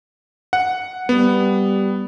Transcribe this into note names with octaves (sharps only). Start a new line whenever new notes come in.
F#5
G3 B3